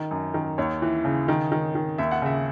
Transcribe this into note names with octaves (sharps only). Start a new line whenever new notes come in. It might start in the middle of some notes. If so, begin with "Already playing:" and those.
Already playing: D#3
F#2
D#3
D#2 C#5
E3
C#3
D#3
D#3
D#3
D#2 E5
F#5
C#3 E5